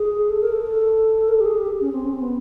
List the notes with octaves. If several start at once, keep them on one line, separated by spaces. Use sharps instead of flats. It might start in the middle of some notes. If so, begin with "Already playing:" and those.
Already playing: G#4
A4
A#4
A4
A#4
A4
G4
G#4
G4
C#4
C4
C#4
C4
B3